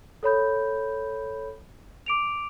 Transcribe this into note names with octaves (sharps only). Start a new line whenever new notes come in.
A4 C#5 B5 G6
D6 D7 F7